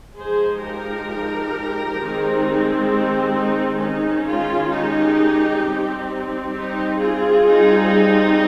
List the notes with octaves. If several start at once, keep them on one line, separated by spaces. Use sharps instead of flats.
F3 G#3 D#4 G#4 C5
G4 A#4
D#3 G#3 C4 D#4
D#4 G4
D#4
D#3 G#3 C#4 D#4
F4
D#4 G4
G3 C4 D#4
D#4 G4
F4 G#4
G3 C4 D#4